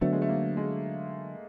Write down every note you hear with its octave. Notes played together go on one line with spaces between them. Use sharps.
D3 F#3 A3 B3 D4
G#3
A3
A#3
G#3